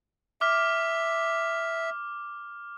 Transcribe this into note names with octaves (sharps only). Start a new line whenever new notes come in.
E5 D6 F6